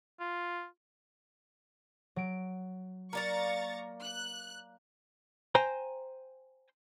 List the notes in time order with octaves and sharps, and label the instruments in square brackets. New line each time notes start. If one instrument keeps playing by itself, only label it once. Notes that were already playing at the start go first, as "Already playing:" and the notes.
[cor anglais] F4
[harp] F#3 D7
[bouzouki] A#3 D5 F5 [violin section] A#5 C#6 A6
[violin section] F#6
[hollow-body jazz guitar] C5 G5 G#5 A#5